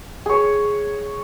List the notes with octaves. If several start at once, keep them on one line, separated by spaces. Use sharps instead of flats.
G#4 C#5